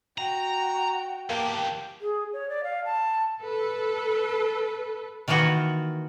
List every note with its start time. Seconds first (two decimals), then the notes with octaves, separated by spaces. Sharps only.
0.18 F#4 G5 A#5
1.30 E2 A#3 G4 G5 A5
2.01 G#4
2.33 C#5
2.49 D5
2.64 F5
2.85 A5
3.42 A4 B4
5.28 D#3 E3 A#3 F4 F#4